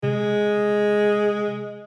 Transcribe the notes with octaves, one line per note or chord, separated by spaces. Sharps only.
C3 G#3